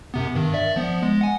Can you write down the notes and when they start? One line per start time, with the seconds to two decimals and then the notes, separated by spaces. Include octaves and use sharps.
0.14 F#2 C3 B3
0.35 G2 D#3
0.54 D5 E5
0.76 F3 B3
1.03 G#3
1.21 F#5 G#5